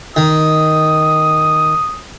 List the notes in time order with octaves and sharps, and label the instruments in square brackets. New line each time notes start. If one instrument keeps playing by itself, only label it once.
[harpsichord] D#3 [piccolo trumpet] D#6